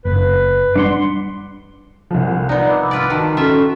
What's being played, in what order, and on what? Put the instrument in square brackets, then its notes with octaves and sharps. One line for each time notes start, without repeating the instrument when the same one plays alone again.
[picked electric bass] F#1 [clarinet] B4
[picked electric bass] G3 [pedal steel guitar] D4 F#5 C6
[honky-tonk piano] C2 F3
[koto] B3 D#4 [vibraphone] D5
[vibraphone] B5 D6 E6
[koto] F4 B4 D5
[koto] D#3 [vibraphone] F#4 A5
[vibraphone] C#4 F#4 A4 [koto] F4 E5